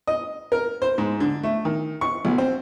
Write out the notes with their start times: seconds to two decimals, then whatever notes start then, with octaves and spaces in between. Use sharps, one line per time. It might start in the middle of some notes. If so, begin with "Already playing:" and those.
0.07 D#5
0.52 A#4
0.82 C5
0.98 G#2
1.20 D3
1.43 A3
1.65 D#3
2.01 C#6
2.25 B1
2.38 C4